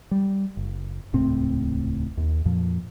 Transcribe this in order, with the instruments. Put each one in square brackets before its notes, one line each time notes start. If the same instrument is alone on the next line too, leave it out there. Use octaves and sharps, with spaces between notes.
[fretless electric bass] G3
F#1
D#1 C#2 A2 C4
D#2
F2 A#2 F3